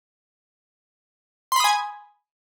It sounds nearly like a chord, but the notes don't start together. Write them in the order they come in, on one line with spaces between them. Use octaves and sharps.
C6 B5 D#6 G#5